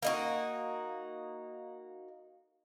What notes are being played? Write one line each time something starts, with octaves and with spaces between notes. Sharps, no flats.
A#3 D#4 F#4